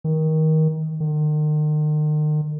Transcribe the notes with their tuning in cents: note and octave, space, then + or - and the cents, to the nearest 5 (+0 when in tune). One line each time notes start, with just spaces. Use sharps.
D#3 +20
D#3 -40